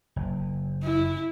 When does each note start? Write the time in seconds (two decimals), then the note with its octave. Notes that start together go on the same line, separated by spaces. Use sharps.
0.16 F#1
0.83 E4